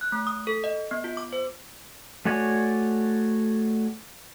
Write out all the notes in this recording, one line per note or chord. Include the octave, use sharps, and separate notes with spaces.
F#6
A3
D#6
A4
D#5
B3
F4
D6
C5
A3 F#4 C#5 D5 G#5